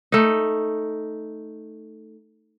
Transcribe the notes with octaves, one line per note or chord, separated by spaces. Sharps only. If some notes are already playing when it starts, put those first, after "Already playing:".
A3 D#4